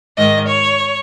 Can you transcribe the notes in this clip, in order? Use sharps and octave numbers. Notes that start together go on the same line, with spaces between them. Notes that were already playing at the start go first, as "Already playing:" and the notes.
G#2 D#3 D#5
C#5